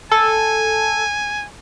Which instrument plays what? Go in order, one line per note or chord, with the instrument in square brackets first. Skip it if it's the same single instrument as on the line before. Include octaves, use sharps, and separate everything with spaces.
[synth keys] A4 [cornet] G#5